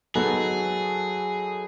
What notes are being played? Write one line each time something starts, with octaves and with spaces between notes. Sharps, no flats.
F#3 B3 D#4 F#4 G#4 A4